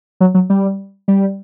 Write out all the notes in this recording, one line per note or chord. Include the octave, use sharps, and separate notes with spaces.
F#3
F#3
G3
G3